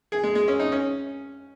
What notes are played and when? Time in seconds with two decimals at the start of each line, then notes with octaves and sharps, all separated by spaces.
0.12 G#4
0.23 G#3
0.35 G#3
0.48 C#4
0.59 D#4
0.72 C#4